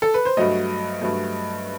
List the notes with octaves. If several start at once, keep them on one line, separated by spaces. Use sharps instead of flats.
A4
B4
C5
G2 F#3 A3 D#5
G2 F#3 A3